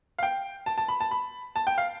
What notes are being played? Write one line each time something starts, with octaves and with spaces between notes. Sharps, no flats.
F5
G5
A5
A5
B5
A5
B5
A5
G5
F5